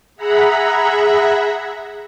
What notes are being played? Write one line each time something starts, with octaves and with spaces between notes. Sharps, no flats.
G#4 E5 F#5 A#5 B5